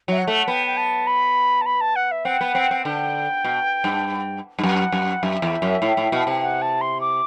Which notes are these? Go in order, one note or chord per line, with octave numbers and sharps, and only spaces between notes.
F#3 E5
F#5
A3
B3 G5
G5
A5
B5
A5
B5
A5
F#5
E5
C4 F#5
B3
C4
C4
D3 G5
B2
G2
G2
F#2 F#5
F#2
F#2 E5
E2
F#2
A2
A2
B2
C3
F#5
A5
C6
D6